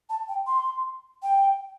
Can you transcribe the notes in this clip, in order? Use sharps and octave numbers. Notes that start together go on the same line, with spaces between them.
A5
G5
C6
G5